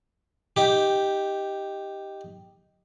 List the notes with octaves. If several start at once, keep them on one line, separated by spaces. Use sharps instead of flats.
D#4 G4